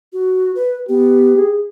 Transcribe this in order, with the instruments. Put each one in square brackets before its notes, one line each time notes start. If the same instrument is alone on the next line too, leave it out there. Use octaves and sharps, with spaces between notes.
[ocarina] F#4
B4
[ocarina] B3 [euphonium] G4
[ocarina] G#4